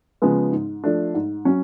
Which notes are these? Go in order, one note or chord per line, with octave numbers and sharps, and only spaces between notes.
C#3 F3 G#3 B3
G#2
F3 A3 D4
G#2
F#3 C#4